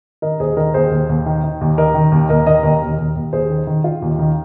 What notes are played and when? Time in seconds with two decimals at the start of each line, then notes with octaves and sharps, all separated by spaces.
0.22 D#3 A#4 D#5
0.40 D#2 G#4 C5
0.57 D#3 A#4 D#5
0.74 D#2 G#4 C5
0.91 D#2
1.09 D#2
1.26 D#3
1.44 D#3
1.61 D#2
1.78 D#3 A#4 D#5
1.95 D#3
2.12 D#2
2.29 D#2 A#4 D#5
2.46 D#3 A#4 D#5
2.63 D#2 A#4 D#5
2.82 D#2
2.98 D#2
3.16 D#2
3.33 D#2 G#4 C5
3.50 D#3
3.67 D#3
3.84 D#3 F4
4.02 D#2
4.19 D#3